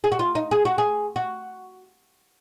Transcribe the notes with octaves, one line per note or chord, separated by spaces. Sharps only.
G#4
F#4
F4
D#4
G#4
F#4
G#4
F#4